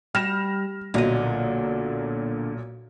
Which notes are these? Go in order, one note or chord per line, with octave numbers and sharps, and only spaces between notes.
G3 F6 A#6 E7
B1 A#2 D3 D#5